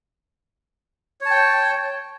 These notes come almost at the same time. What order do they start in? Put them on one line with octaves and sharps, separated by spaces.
C#5 A5 G5